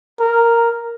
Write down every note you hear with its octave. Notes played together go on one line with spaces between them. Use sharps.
A#4